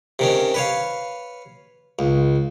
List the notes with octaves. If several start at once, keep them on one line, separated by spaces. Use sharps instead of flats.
C3 D#3 C#4
B4 C#5 F5
C#2